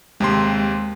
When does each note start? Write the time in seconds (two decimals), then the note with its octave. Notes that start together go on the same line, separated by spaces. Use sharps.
0.20 D#2 C3 G#3 C6